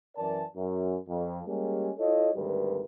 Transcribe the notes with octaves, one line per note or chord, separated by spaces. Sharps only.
F#2 E3 A#4 D5 A5
F#2
F2
G3 G#3 A#3 C#4 G4 G#4
E4 F4 A4 C#5 D#5
G#1 D2 G3 A#4 B4